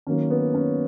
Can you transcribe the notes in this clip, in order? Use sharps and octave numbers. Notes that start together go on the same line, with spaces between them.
D#3 F#3 A#3 C#4
B3
C#4